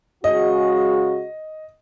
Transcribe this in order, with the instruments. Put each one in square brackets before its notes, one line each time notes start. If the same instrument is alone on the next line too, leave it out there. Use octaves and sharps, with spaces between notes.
[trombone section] C#3 G#3 F#4 [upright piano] D#5